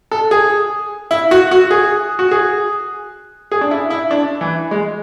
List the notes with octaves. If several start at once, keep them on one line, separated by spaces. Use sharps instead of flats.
A4
G#4
E4
F#4
F#4
G#4
F#4
G#4
G#4
D4
E4
E4
D4
E3
G#3